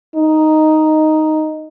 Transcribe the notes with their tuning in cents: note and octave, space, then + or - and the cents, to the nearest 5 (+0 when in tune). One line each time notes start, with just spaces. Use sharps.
D#4 +0